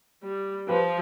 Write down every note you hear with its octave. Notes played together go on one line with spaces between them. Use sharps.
G3
F3 G4 B4